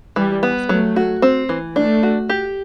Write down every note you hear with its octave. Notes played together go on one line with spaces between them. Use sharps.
E3 G3
B3
F#3 A3
F#4
C4
E3
A3 D4
F#4
G4